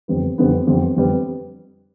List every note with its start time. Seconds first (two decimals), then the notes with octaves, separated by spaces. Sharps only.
0.08 F2 D3 G3 B3
0.38 F2 D3 G3 B3
0.67 F2 D3 G3 B3
0.96 F2 D3 G3 B3